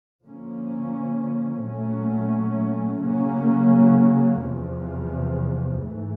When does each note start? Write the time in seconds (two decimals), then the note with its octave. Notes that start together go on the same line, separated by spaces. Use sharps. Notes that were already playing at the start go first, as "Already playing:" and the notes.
0.24 D3 F3 A#3 C#4
1.64 A#2 F#3 A3 C#4
3.03 C#3 F#3 A#3 C#4
4.42 E2 C3 F3
5.82 G#2 E3 A3